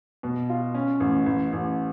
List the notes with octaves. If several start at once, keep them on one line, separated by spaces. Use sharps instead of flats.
B2
F4
C#4
A1
A1
A1